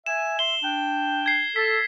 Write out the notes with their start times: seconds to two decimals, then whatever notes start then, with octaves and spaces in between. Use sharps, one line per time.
0.06 E5 G#5 E7
0.39 E5 C6 G7
0.63 D4 G5
1.26 G#6 C7
1.56 A4 B6